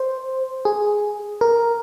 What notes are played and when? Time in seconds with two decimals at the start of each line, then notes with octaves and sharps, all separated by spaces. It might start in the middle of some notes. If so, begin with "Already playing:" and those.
Already playing: C5
0.65 G#4
1.41 A#4